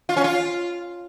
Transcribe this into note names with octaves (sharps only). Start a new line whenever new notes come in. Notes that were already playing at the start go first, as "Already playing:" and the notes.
F4
C#4
F4